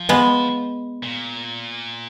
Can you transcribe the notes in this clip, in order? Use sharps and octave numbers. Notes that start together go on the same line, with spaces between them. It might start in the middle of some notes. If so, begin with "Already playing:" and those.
Already playing: F3
G#3 B3
A#2